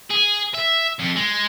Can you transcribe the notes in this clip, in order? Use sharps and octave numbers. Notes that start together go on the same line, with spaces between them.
G#4
E5
F2
G#3